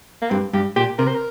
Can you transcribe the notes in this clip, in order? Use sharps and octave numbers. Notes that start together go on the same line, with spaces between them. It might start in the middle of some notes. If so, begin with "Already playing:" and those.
A#3
G2 C4
G2 G4
A#2 G4
C3 A#4
C5
A#4